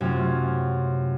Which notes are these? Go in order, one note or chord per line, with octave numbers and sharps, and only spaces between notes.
F#2 C3 A3 C#4 F4